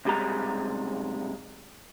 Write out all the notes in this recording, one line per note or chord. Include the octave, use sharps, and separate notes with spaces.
B1 F#2 C3 G3 G#3 A#5